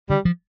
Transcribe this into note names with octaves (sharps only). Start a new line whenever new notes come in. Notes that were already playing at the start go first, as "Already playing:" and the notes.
D3 G3
F3